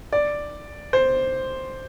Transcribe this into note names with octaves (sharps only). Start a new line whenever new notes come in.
D5
C5